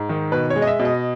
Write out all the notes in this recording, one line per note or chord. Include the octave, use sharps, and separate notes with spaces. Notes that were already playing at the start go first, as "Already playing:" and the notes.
Already playing: G#2
D#3
B2 B4
C#5
G#3
D#5
E5
B2
D#5